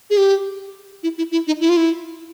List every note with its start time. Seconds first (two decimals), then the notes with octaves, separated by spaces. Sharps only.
0.10 G#4
0.17 G4
1.03 E4
1.18 E4
1.32 E4
1.47 D#4
1.61 E4
1.69 F4
1.77 E4